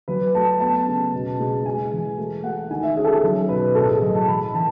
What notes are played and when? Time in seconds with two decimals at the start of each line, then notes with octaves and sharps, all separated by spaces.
0.08 F#3 B4
0.34 A3 A5
0.60 B3 A5
0.87 C#3
1.13 B2
1.40 G#3
1.65 G#3 G#5
1.92 E3
2.17 A3
2.44 A3 F#5
2.70 D#3 G#5
2.83 E5
2.96 C#4 G#4
3.05 A4
3.10 G#4
3.24 F#3
3.49 B2 B4
3.75 A2 A4
3.88 G#4
4.01 F#3 D#5
4.15 A5
4.28 E3 B5
4.54 E3 A5